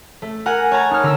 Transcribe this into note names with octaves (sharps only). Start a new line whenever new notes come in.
A3
A#4 F#5 G#5
C#5 A5 A#5 G#6
D#4 F6
D3 A#5 E6